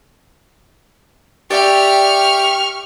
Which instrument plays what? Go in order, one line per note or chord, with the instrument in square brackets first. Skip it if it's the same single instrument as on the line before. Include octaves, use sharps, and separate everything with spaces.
[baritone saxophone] G4 [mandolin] D5 E5 G5 [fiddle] C#6 F6